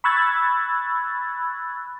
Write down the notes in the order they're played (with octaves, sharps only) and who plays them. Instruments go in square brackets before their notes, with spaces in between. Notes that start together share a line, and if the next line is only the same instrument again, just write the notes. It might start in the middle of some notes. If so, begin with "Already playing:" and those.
[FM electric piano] B5 C#6 E6 F#6 G#6 A6